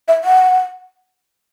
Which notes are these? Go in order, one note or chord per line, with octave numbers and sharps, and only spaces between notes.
E5
F#5